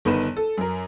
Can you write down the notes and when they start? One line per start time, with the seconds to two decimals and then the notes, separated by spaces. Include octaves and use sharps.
0.05 G1 D#3 B3 B4 D#7 E7
0.37 A4
0.58 F#2 A#4